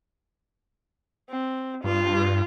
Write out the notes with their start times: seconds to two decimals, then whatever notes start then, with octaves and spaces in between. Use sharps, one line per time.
1.30 C4
1.84 G2 F4